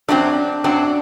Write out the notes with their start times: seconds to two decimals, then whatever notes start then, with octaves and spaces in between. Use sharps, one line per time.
0.08 F#2 F#3 C4 D4
0.64 F#2 F#3 C4 D4